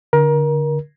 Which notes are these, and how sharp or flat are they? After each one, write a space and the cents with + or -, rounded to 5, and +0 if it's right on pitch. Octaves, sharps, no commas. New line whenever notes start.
D3 -10 A#4 +25